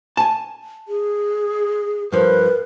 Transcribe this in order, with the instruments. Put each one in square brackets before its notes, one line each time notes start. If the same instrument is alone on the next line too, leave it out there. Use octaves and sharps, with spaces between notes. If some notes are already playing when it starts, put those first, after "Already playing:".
[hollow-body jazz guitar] G#5 A5
[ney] G#4
[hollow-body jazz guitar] G2 F3 [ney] A#4 [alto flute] B4